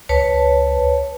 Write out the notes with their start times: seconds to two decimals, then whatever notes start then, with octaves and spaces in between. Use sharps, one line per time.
0.09 C#2 B4 C#5 A5